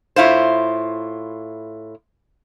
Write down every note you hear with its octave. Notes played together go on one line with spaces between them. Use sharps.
A2 E4 F4 C5